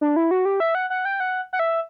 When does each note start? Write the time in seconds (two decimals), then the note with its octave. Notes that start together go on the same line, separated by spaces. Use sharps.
0.01 D4
0.16 E4
0.31 F#4
0.45 G4
0.60 E5
0.75 F#5
0.90 F#5
1.05 G5
1.20 F#5
1.53 F#5
1.59 E5